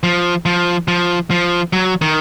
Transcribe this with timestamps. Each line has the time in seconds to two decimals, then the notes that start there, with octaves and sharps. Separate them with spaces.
0.03 F3
0.46 F3
0.88 F3
1.31 F3
1.73 F#3
2.01 D#3